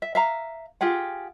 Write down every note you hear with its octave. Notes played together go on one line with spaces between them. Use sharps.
E5
E5 F5 A#5
F4 G4 G#4 F#5